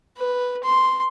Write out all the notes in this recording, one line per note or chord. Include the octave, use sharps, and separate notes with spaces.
B4
C6